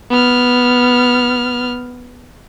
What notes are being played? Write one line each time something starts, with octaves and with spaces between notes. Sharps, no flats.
B3 F6